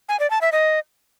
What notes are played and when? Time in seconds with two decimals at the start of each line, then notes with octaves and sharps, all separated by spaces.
0.09 G#5
0.20 D5
0.31 A5
0.41 E5
0.52 D#5